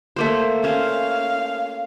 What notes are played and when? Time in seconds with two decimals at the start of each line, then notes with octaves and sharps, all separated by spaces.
0.16 A3 A#3 C5
0.64 C#4 C5 F5